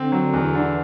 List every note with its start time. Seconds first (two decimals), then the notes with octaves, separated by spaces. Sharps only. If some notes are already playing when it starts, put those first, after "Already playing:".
Already playing: D3 C4
0.12 F#3
0.33 E2 E3
0.55 D3